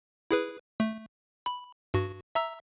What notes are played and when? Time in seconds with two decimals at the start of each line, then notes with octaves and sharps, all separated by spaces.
0.31 E4 G#4 B4
0.80 A3
1.46 B5
1.94 G2 F#4
2.35 E5 A#5 E6